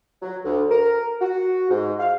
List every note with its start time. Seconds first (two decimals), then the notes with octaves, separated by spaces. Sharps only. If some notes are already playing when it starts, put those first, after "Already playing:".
0.22 F#3
0.45 D2
0.71 A#4
1.21 F#4
1.70 G#2
1.99 F5